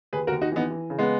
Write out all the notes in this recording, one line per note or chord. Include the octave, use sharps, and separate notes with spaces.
D#2 G#4 B4
F#4 A#4
D#2
D#4 F#4
E3 B3 D#4
E3
C#3
G#3 B3